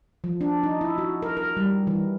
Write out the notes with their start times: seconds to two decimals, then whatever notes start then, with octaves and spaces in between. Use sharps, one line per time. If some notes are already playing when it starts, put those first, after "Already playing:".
0.24 F3
0.41 D4
0.63 D#4
0.81 E4
0.98 F#4
1.22 A#4
1.37 A#4
1.57 G3
1.87 E3